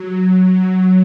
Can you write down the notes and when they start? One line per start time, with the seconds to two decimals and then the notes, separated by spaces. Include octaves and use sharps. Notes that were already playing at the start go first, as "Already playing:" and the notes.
Already playing: F#3